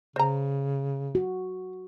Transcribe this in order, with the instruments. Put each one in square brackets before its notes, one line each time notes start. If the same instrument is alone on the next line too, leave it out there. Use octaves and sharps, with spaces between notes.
[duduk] C#3 [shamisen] C5 A#5
[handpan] F#4